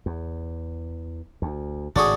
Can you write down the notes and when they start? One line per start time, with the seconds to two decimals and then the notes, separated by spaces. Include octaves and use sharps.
0.06 E2
1.42 D2
1.96 G#1 A2 C#3 D4 F#4 G#4